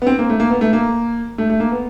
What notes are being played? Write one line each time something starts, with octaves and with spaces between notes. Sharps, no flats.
B3
C4
A#3
A3
A#3
B3
A3
A#3
A3
A3
A#3
B3